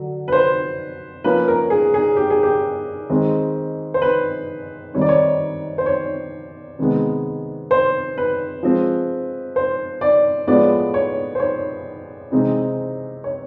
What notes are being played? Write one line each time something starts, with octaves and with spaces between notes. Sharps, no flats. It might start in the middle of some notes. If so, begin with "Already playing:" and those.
Already playing: D3 F#3
B4
C5
F3 A#3 C#4 B4
A#4
G#4
G#4
G4
G#4
G4
D#3 G#3 C4
C5
B4
D#3 G3 C4 D#4 C#5
D5
C#5
C5
C#5
C3 D#3 G#3 B3
C5
B4
F3 G#3 C4
C5
D5
A2 F3 G#3 B3 D5
C#5
C5
C#5
C3 E3 G#3 C4 D#4
C#5